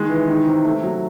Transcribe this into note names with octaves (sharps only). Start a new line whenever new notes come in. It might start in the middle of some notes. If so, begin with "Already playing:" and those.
Already playing: D#3 G#3
E3
D#3
C3
A3
F#3